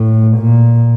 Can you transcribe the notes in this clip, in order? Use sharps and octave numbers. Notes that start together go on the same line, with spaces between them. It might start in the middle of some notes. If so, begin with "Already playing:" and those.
Already playing: A2
A#2